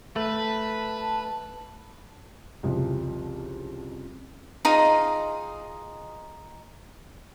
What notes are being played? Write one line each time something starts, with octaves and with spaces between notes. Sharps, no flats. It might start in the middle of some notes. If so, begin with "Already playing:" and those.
A3 B4 A5
C2 F2 C#3 F3
D#4 F4 G#4 D#5